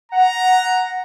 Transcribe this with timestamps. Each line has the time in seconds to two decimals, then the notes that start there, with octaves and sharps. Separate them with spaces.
0.12 F#5 A#5